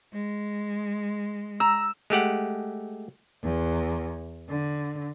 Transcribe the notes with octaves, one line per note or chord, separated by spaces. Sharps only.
G#3
A#5 E6
G#3 A3 G4 F#5
E2
D3